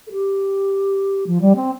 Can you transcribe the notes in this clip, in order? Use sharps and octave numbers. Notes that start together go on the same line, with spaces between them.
A4
G4
F3
G3
C4